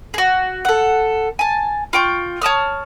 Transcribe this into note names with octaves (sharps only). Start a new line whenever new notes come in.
F#4 G#4
A4 F#5
G#5 A5
F4 G5 C#6
C#5 A5 D#6 F6